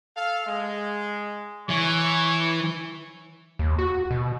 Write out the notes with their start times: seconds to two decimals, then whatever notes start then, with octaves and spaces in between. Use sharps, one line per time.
0.16 A4 F5
0.46 G#3
1.69 E3 C#5 G#5 C#6
3.59 D#2
3.79 F#4
4.11 B2